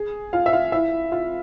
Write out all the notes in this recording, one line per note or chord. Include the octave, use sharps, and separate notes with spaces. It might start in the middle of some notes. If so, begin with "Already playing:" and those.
Already playing: G#4
F4 F5
E5
F4 F5
E4 E5
F4 F5